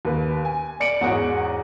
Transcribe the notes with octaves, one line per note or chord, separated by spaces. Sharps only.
D#2 B4
G#5
D5 C#7 D7 F#7
E2 G#2 F#4 G#4 C#5 F#5